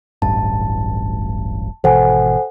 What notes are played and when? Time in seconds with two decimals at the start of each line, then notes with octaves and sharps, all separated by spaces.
0.22 D1 A1 G2 A5
1.84 G#1 B2 E3 A4 C5 F#5 G#5